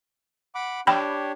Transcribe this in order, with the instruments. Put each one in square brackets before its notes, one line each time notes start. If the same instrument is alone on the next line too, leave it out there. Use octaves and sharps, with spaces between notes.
[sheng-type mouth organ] F#5 B5 D6
[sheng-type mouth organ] D4 G4 C#5 [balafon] G5 B5